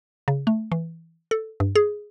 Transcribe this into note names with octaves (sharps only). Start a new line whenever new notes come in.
C#3
A3
E3
A4
G2
G#4